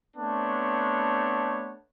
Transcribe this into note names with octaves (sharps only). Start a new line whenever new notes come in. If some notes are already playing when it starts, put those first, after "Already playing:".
A3 B3 C4 D4 C#5